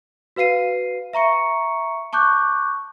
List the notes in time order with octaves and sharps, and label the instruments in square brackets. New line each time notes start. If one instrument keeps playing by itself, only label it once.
[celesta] F#4 B4 F5 C7 D#7
E5 A#5 C#6 C#7
A5 C#6 D6 F#6 G6